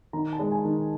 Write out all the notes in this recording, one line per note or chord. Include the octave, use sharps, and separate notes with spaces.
D#3 A#5
A5
G#3
G#5
D#3